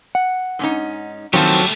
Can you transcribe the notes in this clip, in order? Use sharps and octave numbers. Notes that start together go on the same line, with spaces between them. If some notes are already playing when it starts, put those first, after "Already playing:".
F#5
G#2 C#4 D#4
D#3 F3 F#3 A3 C4 G4 A4